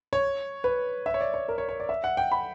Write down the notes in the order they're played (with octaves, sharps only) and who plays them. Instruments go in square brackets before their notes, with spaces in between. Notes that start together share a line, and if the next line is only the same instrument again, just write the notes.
[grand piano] C#5
B4
E5
C#5
D5
C#5
A#4
C#5
C#5
D5
E5
F#5
G5
B5